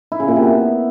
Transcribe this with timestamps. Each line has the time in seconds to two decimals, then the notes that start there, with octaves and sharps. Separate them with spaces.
0.12 E4
0.20 C#3
0.28 A#2
0.36 C3
0.44 B3